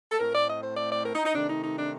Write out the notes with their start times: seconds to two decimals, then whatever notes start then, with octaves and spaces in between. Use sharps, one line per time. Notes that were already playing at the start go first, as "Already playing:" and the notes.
0.12 A4
0.19 A2 A3 C4 A#4
0.35 D5
0.49 D#5
0.63 C5
0.77 D5
0.91 D5
1.06 A#4
1.15 D#4
1.25 D#4
1.34 C3 D#3 A3 D4
1.49 D#4
1.63 D#4
1.79 D4